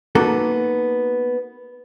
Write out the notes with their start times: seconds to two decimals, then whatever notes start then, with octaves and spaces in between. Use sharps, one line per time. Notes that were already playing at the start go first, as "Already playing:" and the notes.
0.15 A#3 B3 D#4 F#4 A4